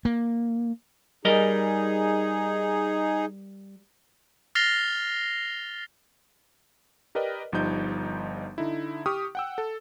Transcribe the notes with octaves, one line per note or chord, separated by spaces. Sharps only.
A#3
G3 D#4 G#4 A#4 D#5
F6 A6 A#6 C7 F7 G7
G4 A#4 B4 D5 D#5 G5
G1 F3 G3 D#4 G6
D3 D#4 E4
G4 C#6 D#6 F6
F#5 G5 E6
A4